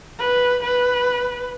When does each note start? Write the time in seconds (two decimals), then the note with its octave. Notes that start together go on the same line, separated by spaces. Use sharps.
0.19 B4
0.63 B4